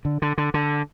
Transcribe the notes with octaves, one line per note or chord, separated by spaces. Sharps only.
D3
D3
D3
D3